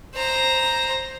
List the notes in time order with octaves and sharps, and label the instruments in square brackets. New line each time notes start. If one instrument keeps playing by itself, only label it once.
[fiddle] C5 A#5